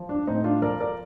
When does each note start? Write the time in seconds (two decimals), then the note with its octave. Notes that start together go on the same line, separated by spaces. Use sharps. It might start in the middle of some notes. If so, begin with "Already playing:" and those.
Already playing: F3
0.09 D4
0.27 A2 C4 D#4
0.44 D4 F4
0.62 F3 A#4 D5
0.80 A#4 D5